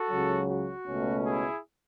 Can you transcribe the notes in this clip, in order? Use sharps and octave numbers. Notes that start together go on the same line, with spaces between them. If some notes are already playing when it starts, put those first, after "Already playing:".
Already playing: F#4 A4
C#2 C#3 F#3
F#4
C#2 B2 A3 C#4
E4 G#4